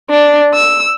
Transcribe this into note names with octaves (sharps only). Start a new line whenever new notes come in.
D4
E6